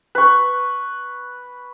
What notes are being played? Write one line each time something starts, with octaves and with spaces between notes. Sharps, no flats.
B4 C#6